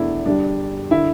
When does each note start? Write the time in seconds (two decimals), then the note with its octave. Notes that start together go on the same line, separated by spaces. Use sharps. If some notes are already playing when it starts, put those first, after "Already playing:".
Already playing: E2 B2 A3 D4 E4
0.26 G1 G2 G3 D4
0.91 D3 E4